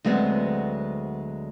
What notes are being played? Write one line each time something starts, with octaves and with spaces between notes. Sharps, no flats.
D2 F#3 G#3 B3 C4